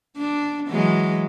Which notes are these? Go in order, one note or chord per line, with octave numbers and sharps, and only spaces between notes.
D4
E3 F#3 G#3